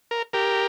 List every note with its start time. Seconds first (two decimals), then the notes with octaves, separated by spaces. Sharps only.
0.11 A#4
0.33 G4 A#4